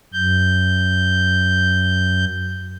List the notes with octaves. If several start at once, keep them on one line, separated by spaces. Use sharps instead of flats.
F#2 G6